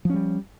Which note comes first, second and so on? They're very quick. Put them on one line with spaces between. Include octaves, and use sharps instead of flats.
F3 C#4 G3